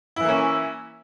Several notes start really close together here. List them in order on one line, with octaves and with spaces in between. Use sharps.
E4 E3 A#3 C#4